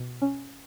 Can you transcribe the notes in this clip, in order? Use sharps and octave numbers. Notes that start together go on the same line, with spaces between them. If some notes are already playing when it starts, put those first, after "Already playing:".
Already playing: B2
C#4